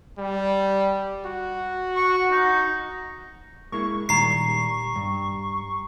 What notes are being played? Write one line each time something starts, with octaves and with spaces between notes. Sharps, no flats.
G3
F#4
C#6
D#4
G#3 A#3 E4 C#6
A#2 D#3 G3 A#5 C7
G2